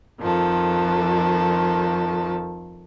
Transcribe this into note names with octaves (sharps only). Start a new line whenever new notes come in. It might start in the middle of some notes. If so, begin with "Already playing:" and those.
F2 D#3 F3 A4